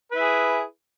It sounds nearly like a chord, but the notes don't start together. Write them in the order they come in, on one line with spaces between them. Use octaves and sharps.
B4 E4 G#4